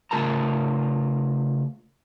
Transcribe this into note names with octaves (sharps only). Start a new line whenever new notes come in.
C#3 A3 F4 A#4 A5 A#5